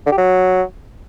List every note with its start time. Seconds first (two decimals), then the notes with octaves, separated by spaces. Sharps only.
0.06 D3
0.12 G4
0.18 F#3